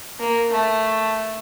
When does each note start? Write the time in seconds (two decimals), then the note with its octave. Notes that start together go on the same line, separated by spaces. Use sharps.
0.20 A#3
0.51 A3